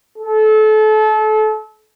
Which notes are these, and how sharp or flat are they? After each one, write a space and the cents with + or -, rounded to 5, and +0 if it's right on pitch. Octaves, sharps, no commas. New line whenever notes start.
A4 -30